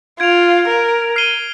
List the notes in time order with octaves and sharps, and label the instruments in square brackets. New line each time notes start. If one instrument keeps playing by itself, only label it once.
[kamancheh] F4 [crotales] G#6 D7 F7
[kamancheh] A#4
[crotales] F6 C7 D#7 G7